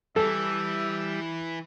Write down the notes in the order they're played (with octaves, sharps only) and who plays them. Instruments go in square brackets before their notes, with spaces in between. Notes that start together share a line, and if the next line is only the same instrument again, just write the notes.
[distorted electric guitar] E3 [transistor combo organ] G3 [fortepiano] A4 [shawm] E5